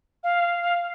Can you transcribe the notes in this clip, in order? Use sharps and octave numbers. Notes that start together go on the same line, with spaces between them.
F5